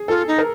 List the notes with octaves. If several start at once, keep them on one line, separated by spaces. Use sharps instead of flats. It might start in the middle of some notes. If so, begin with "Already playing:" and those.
Already playing: G#4
F4 A4
D#4
A#4